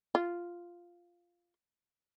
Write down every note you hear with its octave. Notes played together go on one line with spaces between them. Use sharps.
F4